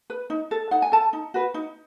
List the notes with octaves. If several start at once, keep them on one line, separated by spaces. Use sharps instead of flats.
B4
D#4
A4
D#4 F#5
G#5
A4 A5
D#4
F#4 B4
D#4